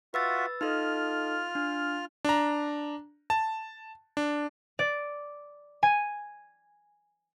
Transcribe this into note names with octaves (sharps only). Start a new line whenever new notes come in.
F4 F#4 B4 E5 E6 A6
D#4 F4 A4 D#5 F6
D4
D4 A#5
A5
D4
D5
G#5